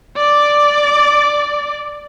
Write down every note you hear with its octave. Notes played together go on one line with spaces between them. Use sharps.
D5 D6